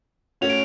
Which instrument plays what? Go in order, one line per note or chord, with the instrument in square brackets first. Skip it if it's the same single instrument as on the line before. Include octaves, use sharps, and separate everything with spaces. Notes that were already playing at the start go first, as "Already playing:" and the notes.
[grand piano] A3 C#4 F#4 C#5 [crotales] F7
[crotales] D7